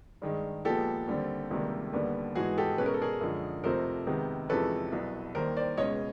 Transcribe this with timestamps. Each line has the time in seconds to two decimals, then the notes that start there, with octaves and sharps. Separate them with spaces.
0.22 G2 D#3 G#3
0.65 A#2 F3 G#3 B3 G4 A4
1.07 D#2 D3 G3 C4
1.51 C#2 C3 D#3 G3 A#3
1.93 D#2 D3 G3 B3
2.35 G#2 E3 G#3 B3 F#4 G#4
2.58 G4 A4
2.78 B2 G#3 C#4 B4
2.86 A#4
2.94 A4
3.02 G#4 A#4
3.21 F#2 D3 F3 G#3
3.64 F2 C3 F3 A3 C4 A#4 C5
4.07 C3 D#3 G#3 B3
4.49 E2 C3 F3 G#3 C#4 A4 B4
4.92 C2 B2 F#3
5.35 D#2 D#3 G3 A#4 C5
5.56 C5 D5
5.77 C#2 B2 G#3 C#4 C#5 D#5